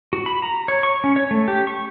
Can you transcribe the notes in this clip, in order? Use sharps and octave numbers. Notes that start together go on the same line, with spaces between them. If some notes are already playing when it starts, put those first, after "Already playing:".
F#4
B5
A#5
C#5
C#6
C#4
C#5
A3
G4
C#6